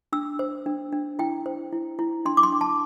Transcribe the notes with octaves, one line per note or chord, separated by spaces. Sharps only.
D4 E6
C5
D4
D4
E4 G5
C5
E4
E4
D4 C6
D6
C6
D4
A5